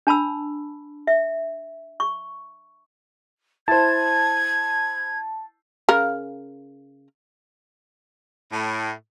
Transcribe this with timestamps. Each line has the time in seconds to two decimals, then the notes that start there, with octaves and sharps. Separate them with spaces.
0.07 D4 A5 B5 E6
1.07 E5
2.00 C#6
3.68 E4 C5 A5 G#6
5.89 C#3 A#4
8.52 A2